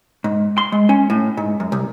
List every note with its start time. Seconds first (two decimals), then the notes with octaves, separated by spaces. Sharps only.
0.24 G#2
0.58 C6
0.72 G#3
0.89 C#4
1.10 A2
1.37 G#2
1.60 F#2
1.72 C2